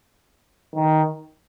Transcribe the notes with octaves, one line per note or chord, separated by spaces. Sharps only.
D#3